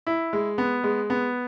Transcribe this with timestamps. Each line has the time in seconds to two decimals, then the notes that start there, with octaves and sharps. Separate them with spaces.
0.07 E4
0.33 G#3
0.58 B3
0.84 G#3
1.10 B3